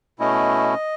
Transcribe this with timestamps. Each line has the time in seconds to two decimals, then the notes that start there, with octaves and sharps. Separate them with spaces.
0.19 B2 A3 C#4 E4 D#5